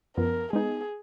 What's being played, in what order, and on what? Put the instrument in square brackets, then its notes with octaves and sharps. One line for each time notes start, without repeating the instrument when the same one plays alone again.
[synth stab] F#2 F3 B3 [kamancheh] A#4
[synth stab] G#3 B3 D#4 [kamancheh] G#4